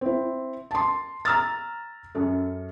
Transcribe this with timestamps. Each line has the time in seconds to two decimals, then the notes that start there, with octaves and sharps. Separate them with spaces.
0.01 C4 E4
0.71 A5 C6
1.25 A#5 E6 F6 A6
2.15 F#2 A4